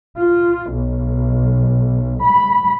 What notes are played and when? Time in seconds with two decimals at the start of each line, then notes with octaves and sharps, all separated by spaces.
0.18 F4
0.73 B1
2.24 B5